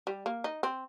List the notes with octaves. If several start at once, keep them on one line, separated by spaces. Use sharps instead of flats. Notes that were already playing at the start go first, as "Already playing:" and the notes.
G3
A#3
D#4
C4